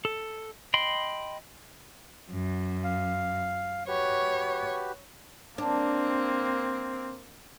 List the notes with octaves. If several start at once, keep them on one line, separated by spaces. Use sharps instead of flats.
A4
D#5 G5 B5 C6
F#2
F5
F#4 G4 B4 C#5
A#3 C4 D4